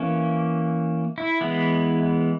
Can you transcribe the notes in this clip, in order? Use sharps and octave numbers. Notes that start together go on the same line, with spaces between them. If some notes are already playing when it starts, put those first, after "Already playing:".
Already playing: E3 A#3 C#4
E4
E3 G#3 B3